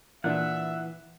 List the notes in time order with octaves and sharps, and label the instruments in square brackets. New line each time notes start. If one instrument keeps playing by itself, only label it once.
[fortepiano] A#2 D4 [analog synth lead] E3 [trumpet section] E5 [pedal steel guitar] F#5